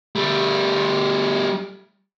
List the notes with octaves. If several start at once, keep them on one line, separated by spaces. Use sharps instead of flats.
G3 A3